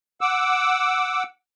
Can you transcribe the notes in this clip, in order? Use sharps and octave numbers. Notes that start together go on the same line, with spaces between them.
F#5 D6 E6